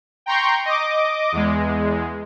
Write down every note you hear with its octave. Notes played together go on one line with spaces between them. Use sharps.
G5 A#5 C6 C#6 G6
D#5 D6
E2 G#3